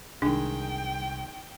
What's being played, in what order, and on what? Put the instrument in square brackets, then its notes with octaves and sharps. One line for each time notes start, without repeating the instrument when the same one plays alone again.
[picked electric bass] C2 [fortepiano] D#3 G#3 [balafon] D4 [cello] G5